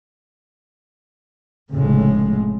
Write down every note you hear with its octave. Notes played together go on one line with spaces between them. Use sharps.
F1 A2 C#3 G#3